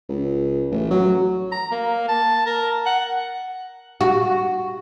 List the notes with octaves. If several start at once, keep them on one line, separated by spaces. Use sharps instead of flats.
C#2
A1
F#3
A#5
A#3
A5
A#4
F#5
F#4